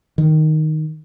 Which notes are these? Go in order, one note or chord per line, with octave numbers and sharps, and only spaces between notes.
D#3